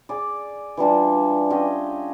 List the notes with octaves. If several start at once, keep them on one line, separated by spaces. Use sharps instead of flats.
G#4 D5
E3 G3 D4 F4
C#4 F4 G4 D#5